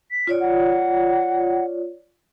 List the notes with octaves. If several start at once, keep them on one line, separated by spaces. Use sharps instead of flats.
B6
F4 C#5 D5
F#5